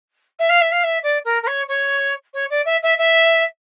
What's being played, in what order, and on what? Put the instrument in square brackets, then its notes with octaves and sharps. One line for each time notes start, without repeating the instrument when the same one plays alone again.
[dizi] E5
F5
E5
F5
E5
D5
A#4
A#4
C#5
C#5
C#5
D5
E5
E5
E5